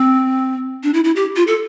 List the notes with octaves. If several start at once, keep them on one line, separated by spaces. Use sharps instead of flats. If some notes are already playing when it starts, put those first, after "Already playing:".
Already playing: C4
D4
E4
E4
G4
F4
A4